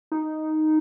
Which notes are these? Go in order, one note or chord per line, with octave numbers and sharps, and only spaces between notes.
D#4